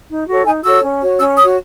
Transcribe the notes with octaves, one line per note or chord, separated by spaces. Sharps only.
D#4
F#4 A4 C#5
D#4 G#5
F#4 A4 C#5 E6
C#4
F#4 C#5
C#4 E6
F#4 C#5 D#6